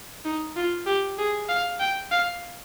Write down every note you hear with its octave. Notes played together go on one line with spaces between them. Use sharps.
D#4
F4
G4
G#4
F5
G5
F5